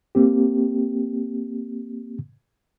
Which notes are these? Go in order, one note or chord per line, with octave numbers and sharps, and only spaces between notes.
A#3 C4 G4